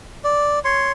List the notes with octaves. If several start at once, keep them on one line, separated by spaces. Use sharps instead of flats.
D5
C#5 C6